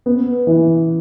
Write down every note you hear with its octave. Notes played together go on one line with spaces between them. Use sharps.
B3
E3